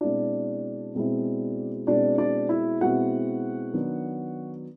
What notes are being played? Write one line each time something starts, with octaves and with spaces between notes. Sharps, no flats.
B2 G#3 C4 D4 E4 D5
B2 G#3 C4 E4
B2 G#3 C4 D4 E4 D5
D4 D5
E4 E5
B2 G#3 C4 E4 F#4 F#5
D#3 F#3 B3 D4